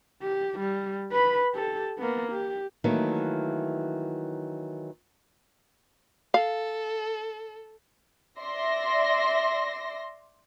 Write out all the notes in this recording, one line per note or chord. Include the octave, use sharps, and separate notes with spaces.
G4
G3
B4 B5
G4 A4
A#3 B3
G4
D#3 E3 F#3 A3 A#3
A4 F5
D5 E5 C6 A#6